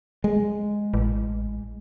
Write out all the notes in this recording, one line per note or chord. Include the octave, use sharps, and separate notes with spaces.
G#3
A1